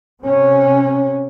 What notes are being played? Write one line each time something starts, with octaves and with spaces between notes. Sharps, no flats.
C3 C#4